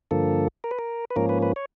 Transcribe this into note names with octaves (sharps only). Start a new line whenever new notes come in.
G2 D3 F3 A#3 A4
A#4
B4
A#4
B4
G#2 F3 A#3 C#4 A#4
B4
B4
C#5